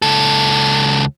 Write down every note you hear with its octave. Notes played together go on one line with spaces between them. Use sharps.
C#2 A4